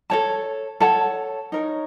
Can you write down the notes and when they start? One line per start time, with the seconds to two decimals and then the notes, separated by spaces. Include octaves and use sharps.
0.10 A4 C#5 A5
0.80 A4 C#5 F#5 A5
1.52 D#4 A#4 C#5